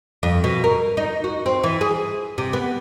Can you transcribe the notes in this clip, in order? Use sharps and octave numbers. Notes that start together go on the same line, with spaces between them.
F2
B2
A#4
D#4
F#4
C4
E3
G#4
C3
B3